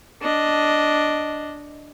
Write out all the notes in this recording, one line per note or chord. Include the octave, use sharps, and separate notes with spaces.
D4 D#5